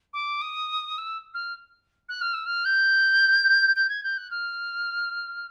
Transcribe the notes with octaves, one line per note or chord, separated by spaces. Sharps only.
D6
D#6
E6
F6
F#6
F6
E6
F6
G6
G6
G#6
G6
F#6
F6